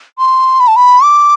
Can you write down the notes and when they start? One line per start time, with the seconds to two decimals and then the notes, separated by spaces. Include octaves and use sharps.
0.19 C6
0.60 B5
0.68 A5
0.76 B5
1.03 D6